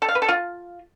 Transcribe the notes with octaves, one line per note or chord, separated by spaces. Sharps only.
A4
F5
B4
A4
F4